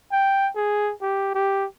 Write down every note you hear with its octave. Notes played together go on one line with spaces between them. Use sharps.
G5
G#4
G4
G4